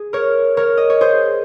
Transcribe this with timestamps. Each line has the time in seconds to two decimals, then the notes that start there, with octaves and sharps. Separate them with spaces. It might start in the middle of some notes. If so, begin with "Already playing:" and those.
Already playing: G#4
0.13 A#4 C#5
0.57 A#4 C#5
0.77 D#5
0.90 C#5
1.01 G#4 C5